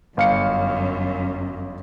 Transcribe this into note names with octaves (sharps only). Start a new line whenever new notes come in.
G1 F#2 F5 C#7